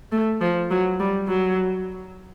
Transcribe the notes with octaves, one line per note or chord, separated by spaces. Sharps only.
A3
F3
F#3
G3
F#3